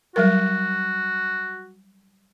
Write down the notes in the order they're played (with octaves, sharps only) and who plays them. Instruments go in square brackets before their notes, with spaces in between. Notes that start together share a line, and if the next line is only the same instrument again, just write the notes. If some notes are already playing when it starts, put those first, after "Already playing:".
[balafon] F#3 G3 A#4 [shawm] F#4